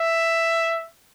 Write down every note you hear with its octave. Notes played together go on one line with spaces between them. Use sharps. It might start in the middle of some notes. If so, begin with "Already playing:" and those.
Already playing: E5